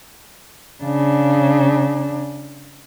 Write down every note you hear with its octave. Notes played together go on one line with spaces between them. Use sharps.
C#3 D4